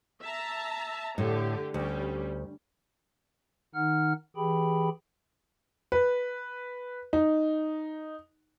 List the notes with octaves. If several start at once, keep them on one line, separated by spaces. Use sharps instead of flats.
E5 A5 A#5
A2 D3 G4
D2 G3 C#4
D#3 D#4 F#5 F6
E3 G4 G#4 G5 B5
B4
D#4